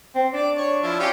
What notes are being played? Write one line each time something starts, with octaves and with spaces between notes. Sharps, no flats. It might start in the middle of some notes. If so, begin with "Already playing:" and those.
C4
D4 D5
C#5 C#6
F3 E4
C#4 F4 G4